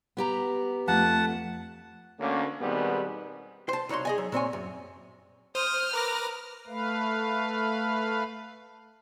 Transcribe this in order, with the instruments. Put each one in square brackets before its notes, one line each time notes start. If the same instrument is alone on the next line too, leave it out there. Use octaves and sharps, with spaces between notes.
[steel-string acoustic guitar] B3 G4 A#5
[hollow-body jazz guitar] F2 [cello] A3 [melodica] F#5 A5
[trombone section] D2 A#3 C#4
B2 D#3 G3 G#3 B3 C4
[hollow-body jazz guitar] C5 A5
C2 D#4 F#4 C#5 C6
G#4 D#5 G#5
F#3
A#2 C4 C#5 G#5
F#2
[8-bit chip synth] C5 [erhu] D#6 [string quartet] F6
[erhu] A#4 [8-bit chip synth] B4 D6 A#6
[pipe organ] A3 B4 F5